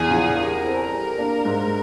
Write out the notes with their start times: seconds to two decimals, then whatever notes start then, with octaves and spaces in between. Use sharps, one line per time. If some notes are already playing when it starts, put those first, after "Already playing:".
Already playing: E2 G#4
0.10 C#3 F3
0.36 G3 A#4
0.63 C4 E4 A4 C5
0.91 G3
1.18 A#3 D4
1.45 G#2